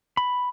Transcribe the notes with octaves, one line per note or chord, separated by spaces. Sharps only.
B5